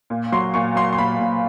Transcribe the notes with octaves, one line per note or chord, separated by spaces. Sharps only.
A#2
F#3 C6
A#2 C#6
F#3 C6
C6
A#2 B5
A#2